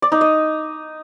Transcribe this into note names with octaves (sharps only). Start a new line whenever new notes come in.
D5
D#4
D#5